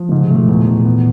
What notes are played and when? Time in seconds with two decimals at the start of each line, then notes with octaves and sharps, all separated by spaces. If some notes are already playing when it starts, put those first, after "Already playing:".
Already playing: F3
0.09 G#2 C#3
0.23 C3
0.30 A3
0.36 B2
0.49 E2 A#2
0.67 E2
0.85 B3